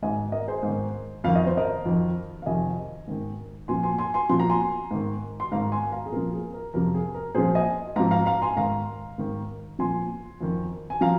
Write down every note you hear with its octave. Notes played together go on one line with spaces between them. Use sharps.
G#2 D#3 D#5 G#5
A#4 D#5
G#4 C5
G#2
D#3
F2 D#3 F5
D#5
C5
A#4 D#5
F2 D#3
F5
F2 C3 D#3 D#5 G#5
G#2 D#3
A#2 F3 G#5 C6
G#5 C6
G#5 C6
G#5 C6
A#2 F3 C6
A#5
G#5 C6
G#2 D#3
C6
G#2 D#3 F5 A#5
G#5 C6
F5 A#5
G#4
A#2 F3 A#4
G#4
A#4
F2 C3 F3 A#4
G#4
A#4
A#2 F3 G#4 C5
D#5 G#5
G#2 F3 F5 A#5
F5 A#5
F5 A#5
G#5 C6
G#2 D#3 F5 A#5
G#2 D#3
A#2 F3 G#5 C6
F2 D#3
G#5
F3 F5 A#5